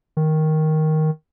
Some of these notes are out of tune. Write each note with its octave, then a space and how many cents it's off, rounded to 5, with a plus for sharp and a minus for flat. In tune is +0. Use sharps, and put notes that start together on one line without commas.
D#3 +5